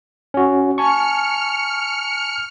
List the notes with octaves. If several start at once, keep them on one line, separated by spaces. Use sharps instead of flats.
C#4 F#4
G#5 A5 C#6 F6 C#7